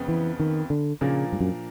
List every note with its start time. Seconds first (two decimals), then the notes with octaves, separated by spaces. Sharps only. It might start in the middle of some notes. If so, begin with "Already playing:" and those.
Already playing: F2 C#3 B3
0.08 E3
0.40 D#3
0.70 D3
1.01 A#2 C#3 F3 A#3 D4
1.32 G2
1.40 F#2